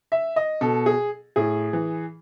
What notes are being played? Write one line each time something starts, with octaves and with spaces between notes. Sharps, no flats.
E5
D#5
B2 A4
G#4
A2 G#4
E3